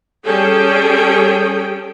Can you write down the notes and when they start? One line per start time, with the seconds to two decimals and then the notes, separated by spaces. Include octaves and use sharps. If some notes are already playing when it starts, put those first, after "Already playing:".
0.24 G3 C#4 G#4 A4 G5